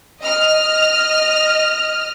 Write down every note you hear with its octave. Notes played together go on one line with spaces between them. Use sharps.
D#5 F6